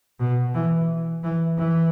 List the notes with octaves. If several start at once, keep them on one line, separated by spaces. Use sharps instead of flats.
B2
E3
E3
E3